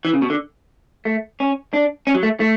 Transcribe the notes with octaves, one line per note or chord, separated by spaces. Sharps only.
E3
C#3
B2
D3
A3
C#4
D4
C#4
F#3
A3
A3